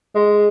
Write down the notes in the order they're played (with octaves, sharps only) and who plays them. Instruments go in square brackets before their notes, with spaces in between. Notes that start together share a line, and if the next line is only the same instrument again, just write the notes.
[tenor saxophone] G#3